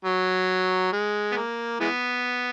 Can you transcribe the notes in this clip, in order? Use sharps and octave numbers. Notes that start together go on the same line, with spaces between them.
F#3
G#3
B3
A#3
E3 G#3 B3